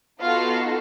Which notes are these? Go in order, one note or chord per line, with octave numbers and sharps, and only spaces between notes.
B3 D#4 F4 F#4 A4 F5